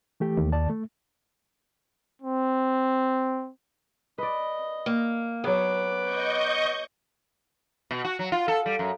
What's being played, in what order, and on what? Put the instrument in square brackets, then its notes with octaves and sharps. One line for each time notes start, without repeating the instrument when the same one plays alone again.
[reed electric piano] E3 A3 G4
[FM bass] D#2
[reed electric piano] D#3 D5 A5
A3
[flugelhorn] C4
[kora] B4 D5 [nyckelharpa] D#5
[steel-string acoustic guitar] A#3
[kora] F#3 G#4 [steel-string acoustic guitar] B3 [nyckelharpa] B4 D6
[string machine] D#5 C#6 G6
[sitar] B2
F#4
F#3
F4
A4
G3
F#2